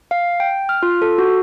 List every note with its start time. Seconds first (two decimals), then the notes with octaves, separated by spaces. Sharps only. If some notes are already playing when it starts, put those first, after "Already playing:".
0.11 F5
0.40 G5
0.69 F6
0.83 F4
1.02 A4
1.18 F#4